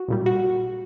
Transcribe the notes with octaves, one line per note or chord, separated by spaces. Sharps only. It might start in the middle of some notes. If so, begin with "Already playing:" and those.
Already playing: F#4
A#1 A#2 G3
F#4